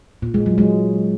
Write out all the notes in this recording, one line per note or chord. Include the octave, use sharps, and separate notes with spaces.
A#2
G#3
F#3
G#3